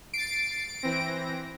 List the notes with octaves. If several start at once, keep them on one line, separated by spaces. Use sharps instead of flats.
A6 C7 D7
E3 C4 A#6